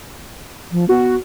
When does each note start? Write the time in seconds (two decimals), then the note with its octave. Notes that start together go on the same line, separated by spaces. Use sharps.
0.72 F3
0.89 B3 F#4